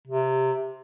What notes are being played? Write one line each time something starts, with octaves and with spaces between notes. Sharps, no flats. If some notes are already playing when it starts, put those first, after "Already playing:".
C3